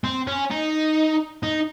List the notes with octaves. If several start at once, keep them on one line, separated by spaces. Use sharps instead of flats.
C4
C#4
D#4
D#4